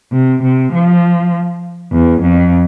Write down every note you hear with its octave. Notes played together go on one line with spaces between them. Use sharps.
C3
C3
F3
E2
F2